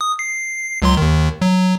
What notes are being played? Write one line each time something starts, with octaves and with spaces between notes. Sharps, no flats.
D#6
C7
C#2 F#3 C6
D#2 D#3
F#3